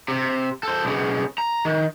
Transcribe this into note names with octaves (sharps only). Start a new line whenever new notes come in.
C3
A4 C5
B1 C#3
A#5
D#3